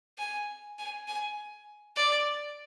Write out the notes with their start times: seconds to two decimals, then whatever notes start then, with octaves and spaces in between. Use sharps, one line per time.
0.18 G#5
0.78 G#5
1.08 G#5
1.96 D5